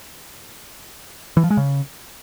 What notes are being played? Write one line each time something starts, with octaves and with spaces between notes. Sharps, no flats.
E3
F3
G#3
C#3